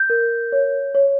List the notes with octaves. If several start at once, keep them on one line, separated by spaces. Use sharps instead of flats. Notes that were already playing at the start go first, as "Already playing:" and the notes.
Already playing: G6
A#4
C#5
C#5